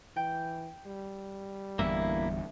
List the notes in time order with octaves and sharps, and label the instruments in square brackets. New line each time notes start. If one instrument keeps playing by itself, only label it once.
[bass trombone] E3 [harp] G5
[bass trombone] G3
[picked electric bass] G1 E2 G2 [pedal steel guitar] A#3 E4 [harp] E5